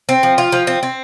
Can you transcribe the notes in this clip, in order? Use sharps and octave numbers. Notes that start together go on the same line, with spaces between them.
C4
F3
F4
F3
C4
C4